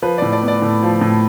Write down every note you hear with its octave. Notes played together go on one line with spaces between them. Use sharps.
F3 B4
A2 D5
D5
B3
D5
A2
F3
A2